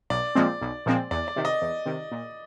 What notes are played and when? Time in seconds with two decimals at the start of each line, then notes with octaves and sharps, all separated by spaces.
0.10 B1 D5
0.35 A#2 F3 G#3 C4
0.61 B1
0.86 A#2 F3 G#3 C4
1.11 E2 D5
1.28 D5
1.36 C3 D#3
1.45 D#5
1.62 E2
1.86 C3 D#3
2.12 A#2